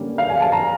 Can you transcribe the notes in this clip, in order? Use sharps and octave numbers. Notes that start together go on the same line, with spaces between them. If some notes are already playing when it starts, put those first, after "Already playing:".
Already playing: D3 G3 A#3 C#4
F5
G#5
A5
A#5